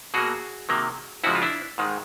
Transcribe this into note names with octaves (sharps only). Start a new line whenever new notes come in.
B2 F#3 A#3 F#4 G#4
C3 D#3 F#3 A#3
F2 C#3 F3 G#3 E4 F#4
F4
D4 E4
G#2 D#3 G#3